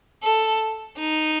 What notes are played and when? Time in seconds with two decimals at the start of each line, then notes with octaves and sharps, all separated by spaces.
0.23 A4
0.99 D#4